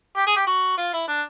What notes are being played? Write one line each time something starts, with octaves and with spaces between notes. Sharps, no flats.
G4
G#4
G4
F#4
F4
E4
D4